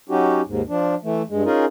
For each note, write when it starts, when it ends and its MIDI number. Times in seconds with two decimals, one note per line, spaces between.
0.10 0.41 54
0.10 0.41 61
0.10 0.41 63
0.10 0.41 66
0.10 0.41 67
0.47 0.62 39
0.47 0.62 44
0.69 0.95 53
0.69 0.95 62
1.04 1.22 52
1.04 1.22 57
1.30 1.44 43
1.30 1.44 56
1.45 1.65 61
1.45 1.65 63
1.45 1.65 65
1.45 1.65 68
1.45 1.65 70